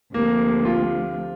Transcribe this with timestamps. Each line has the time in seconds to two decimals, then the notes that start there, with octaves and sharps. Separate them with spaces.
0.13 D2 C3 F3 A#3
0.65 F4